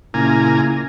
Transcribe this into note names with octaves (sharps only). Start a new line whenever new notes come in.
A#2 C#3 E4 G#5 A#5